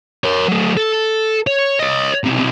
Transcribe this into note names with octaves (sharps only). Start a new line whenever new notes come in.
A#4 C#5
F#3 A3
A4
C#5
C#5 D#5
B1 C3